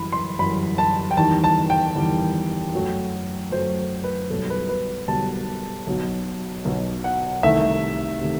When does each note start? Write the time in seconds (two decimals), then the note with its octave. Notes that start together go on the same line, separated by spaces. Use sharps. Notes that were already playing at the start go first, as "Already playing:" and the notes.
Already playing: F#2 E3 G3 B5
0.12 C6
0.39 F#2 E3 G3 B5
0.78 A5
1.11 G5
1.17 E2 D#3 G3 A5
1.44 A5
1.70 G5
1.95 E2 D#3 G3
2.73 F#2 F#3 A3
3.52 F#2 F#3 A3 C5
4.04 B4
4.30 B1 B2 G3 A4
4.50 B4
4.69 B4
5.08 B1 B2 G3 A5
5.87 B1 B2 F#3
6.65 B1 B2 F#3
7.04 F#5
7.43 C2 C3 D#3 A3 E5
8.21 C3 D#3 A3